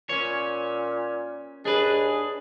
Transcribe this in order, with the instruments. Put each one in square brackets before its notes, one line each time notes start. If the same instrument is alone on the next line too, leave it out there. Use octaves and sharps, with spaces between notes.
[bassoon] A#2 [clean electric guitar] C#4 C#5
[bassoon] D#2 [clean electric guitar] D4 B4 [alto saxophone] G#4